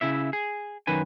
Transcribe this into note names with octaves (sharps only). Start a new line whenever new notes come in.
C#3 E4 E5
G#4
F#2 D#3 B4 G#5